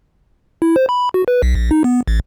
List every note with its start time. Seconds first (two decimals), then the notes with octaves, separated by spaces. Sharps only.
0.62 E4
0.76 C5
0.89 B5
1.14 F#4
1.28 B4
1.42 B1
1.55 A#1
1.71 D#4
1.84 B3
2.08 A1